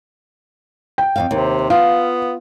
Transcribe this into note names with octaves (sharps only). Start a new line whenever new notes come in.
G5
F2 C3 F5
D#2 C3
B3 F4 F5